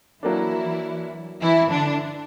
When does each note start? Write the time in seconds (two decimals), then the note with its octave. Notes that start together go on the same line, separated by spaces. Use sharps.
0.23 E3 F#3 A#3 D4 E4
1.41 E3 E4
1.70 D3 D4